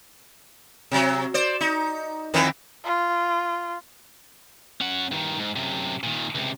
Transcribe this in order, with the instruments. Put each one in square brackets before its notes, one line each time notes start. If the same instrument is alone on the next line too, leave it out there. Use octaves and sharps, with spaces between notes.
[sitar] C3 F#3
C5 D5
D#4
F2 D#3 E3
[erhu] F4
[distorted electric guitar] C#4 F#5
G2 D#3
G#2
F#2 C3
A#2 D#3
C#2 C3